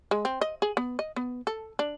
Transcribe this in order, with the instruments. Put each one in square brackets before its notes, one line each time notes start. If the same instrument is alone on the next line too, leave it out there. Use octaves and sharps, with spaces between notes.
[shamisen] G#3
C4
D#5
G#4
B3
D#5
B3
A4
D4